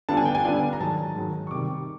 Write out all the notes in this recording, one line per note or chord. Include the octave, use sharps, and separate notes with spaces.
D3 G3 B3 D4 F4 A5
G#5
G5
G#5
D3 G3 B3 D4 F4
A#5
G#2 D#3 F#3 A5
G#2 D#3 F#3
C#6
C3 D#3 G3 D6